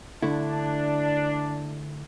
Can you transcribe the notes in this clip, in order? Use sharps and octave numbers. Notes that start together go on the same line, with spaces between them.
D3 A3 D4 E4